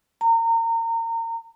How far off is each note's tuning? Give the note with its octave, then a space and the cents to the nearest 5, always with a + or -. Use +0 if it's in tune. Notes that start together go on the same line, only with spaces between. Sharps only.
A#5 -30